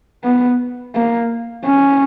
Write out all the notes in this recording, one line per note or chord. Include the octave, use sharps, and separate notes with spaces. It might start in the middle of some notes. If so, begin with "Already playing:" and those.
B3
A#3
C#4